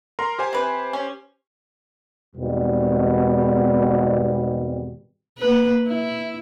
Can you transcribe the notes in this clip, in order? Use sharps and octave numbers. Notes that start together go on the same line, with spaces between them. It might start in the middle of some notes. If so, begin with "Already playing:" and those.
A#4 A#5 C6
G4 C5 G#5
C3 B4
C#4
G#1 E2 B2 G3
A#3 B4
E4